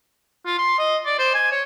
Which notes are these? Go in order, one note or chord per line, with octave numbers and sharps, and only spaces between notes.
F4
C6
D#5
D5
C5
G#5
C#5